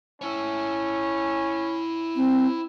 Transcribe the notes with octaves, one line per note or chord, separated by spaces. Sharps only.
C#4 E4 C#5
C4